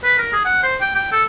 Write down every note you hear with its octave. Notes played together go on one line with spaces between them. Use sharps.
B4
A#4
G#4
F#5
C5
G5
G5
A4